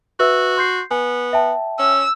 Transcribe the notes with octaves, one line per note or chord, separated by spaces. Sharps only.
F#4 B4 E5 E6
C6 G6 C7
B3 G#5
E5 G5 A5
C#4 E6